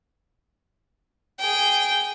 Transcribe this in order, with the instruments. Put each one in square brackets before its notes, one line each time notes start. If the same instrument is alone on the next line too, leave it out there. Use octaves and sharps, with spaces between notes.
[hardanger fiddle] G#4 G5